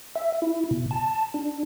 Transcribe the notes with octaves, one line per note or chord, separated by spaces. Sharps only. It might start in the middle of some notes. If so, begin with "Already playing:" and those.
E5
E4
B2
A5
D4